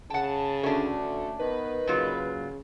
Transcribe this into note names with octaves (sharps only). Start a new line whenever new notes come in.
C#3 F#5 G5 A5
D2 A3 C#4 D4
D#3 B3 B4
A#2 C#3 F#3 F4